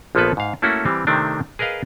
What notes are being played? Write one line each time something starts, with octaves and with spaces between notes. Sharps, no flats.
A#1 F3 A#3 B3 A4 B4
G#2 F5
A3 A#3 C#4 E4 F#4 A4
E3 G3 C4
C3 D#3 A3 C4 D4
G#4 A#4 B4 D#5 F5